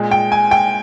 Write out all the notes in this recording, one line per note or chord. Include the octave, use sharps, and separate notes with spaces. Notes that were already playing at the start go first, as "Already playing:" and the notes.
Already playing: A#2 G#3
G5
G#5
G5